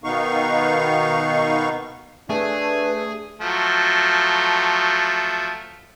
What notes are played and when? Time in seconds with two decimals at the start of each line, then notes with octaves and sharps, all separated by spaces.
0.04 B2 D#3 B3 D#4 F5 C#6
2.30 A3 D4 G#4 B4
3.41 F3 F#3 A3